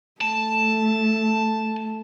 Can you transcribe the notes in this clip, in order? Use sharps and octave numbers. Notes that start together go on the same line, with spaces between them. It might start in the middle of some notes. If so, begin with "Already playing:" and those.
A3 A5